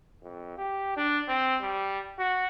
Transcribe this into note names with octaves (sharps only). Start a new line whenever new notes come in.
F2
G4
D4
C4
G3
F#4